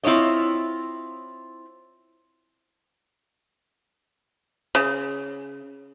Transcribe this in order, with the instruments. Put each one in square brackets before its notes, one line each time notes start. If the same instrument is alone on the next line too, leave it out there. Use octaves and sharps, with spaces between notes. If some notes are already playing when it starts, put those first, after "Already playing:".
[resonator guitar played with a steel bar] C4 E4 F4 C#5 D#5
[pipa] C#3